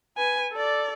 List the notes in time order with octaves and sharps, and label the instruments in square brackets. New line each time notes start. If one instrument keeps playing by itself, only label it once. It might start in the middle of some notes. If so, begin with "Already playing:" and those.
[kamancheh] B4 G#5
A4 D5